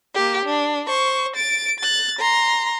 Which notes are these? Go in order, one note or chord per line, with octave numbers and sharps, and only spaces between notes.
A#3 G4
D4
C5 C#6
A6 D7
F#6 A6
A#5 C6